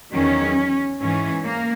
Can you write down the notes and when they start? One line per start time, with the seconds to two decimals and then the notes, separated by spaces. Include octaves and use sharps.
0.13 E2 D#3 F#3 C#4
0.99 G#2 E3 C#4
1.44 A#3